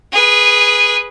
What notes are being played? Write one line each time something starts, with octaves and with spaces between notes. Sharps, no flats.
G#4 B4